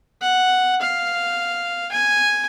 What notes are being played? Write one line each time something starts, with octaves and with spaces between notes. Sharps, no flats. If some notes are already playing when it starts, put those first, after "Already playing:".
F#5
F5
G#5